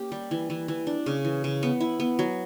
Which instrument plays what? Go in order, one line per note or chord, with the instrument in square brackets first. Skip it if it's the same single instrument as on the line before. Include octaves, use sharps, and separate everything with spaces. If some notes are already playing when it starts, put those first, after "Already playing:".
Already playing: [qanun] A#3 C#4 G4
G3
E3
E3
E3
D4
C#3
E3
C#3
B3
E4
B3
F#3